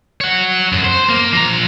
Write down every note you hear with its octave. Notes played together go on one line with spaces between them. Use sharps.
C#5 F#5
F#2
C5
A#3
F3 A#5